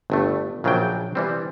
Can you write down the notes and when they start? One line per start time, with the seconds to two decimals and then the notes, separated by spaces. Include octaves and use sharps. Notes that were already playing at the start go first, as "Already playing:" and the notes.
0.10 G1 G2 A3
0.64 A#1 C#3 F#3 D4 G5
1.15 E3 G3 C4